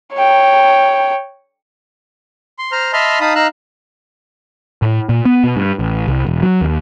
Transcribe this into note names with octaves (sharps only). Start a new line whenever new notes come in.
C#5 G5
C6
C5 A#5 F6
D#5 E5 A5 B5 C6 F6
D#4 F5 A5 B5 D#6
D#4 F5 A#5 E6 F#6
A2
A#2
B3
B2
G2
A1
C2
E1
F#3
D#2